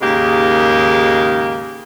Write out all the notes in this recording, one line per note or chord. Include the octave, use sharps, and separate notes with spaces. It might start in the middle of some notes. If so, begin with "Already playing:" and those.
D#2 G#2 C#3 G#3 A#3 G4